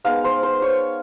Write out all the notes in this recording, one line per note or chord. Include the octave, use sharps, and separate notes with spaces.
G#3 B3 D#4 F5
C5
C5
C#5